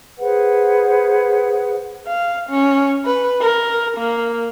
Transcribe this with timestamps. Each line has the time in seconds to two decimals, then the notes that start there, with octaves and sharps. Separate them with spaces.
0.18 G#4 B4 C5 F#5
2.07 F5
2.50 C#4
3.05 B4
3.41 A#4
3.98 A#3